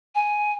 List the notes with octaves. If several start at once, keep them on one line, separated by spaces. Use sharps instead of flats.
G#5